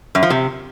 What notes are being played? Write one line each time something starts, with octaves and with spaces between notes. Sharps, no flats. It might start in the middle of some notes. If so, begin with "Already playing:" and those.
F#2
F3
C3